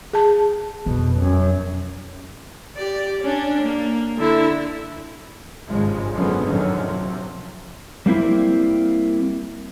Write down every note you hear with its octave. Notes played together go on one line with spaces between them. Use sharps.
G#4 A5
F2 B2
F#2
G4 D5
C#4 D4
A#3
D3 E4
G#1 G2 C#3 F3 G#3
F#2 D3 F3 A#3 B3 C#4
A1 F#2 D3 D#3 F#3 C#4
C3 F3 F#3
G3 A#3 C4 E4